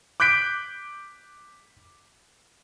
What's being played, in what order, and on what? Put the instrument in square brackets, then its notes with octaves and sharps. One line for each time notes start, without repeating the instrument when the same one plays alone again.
[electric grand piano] D6 F#6 G6 B6 D7